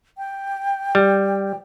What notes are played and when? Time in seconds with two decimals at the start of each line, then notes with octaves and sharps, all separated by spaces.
0.18 G5
0.95 G3